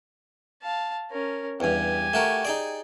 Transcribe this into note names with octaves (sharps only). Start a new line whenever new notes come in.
F5 A5
C#4 A#4
E2 G2 G4 G#5
A3 F#4 A#4
D#4 G#4 D5